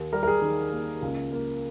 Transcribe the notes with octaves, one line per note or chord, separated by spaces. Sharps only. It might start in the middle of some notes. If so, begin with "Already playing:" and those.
Already playing: D#2
G3 A#4
A#4
G#4
D#3
A#3
C#2
A#3